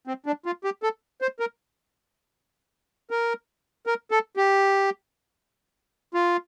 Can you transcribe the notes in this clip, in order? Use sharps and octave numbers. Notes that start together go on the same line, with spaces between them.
C4
D4
F4
G4
A4
C5
A#4
A#4
A#4
A4
G4
F4